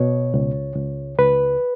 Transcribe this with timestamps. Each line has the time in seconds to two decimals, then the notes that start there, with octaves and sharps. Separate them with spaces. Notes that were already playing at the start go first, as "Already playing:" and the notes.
Already playing: B2 C#5
0.34 C#2
0.76 C#2
1.18 C#2 B4